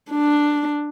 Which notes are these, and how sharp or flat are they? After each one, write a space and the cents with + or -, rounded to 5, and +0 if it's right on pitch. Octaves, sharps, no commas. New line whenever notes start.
D4 +5